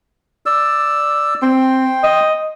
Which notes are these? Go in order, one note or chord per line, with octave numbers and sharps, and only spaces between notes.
D5 E6
C4 G5 C6
D#5